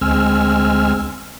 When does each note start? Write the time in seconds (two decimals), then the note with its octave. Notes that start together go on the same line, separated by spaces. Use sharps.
0.01 D2 G#3 C4 G#5 E6 F6